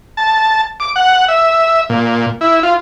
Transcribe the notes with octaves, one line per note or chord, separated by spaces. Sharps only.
A5
D6
F#5
E5
A#2
E4
F4